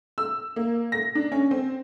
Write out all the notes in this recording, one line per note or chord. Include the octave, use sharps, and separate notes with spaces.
E6
A#3
A#6
D4
C#4
C4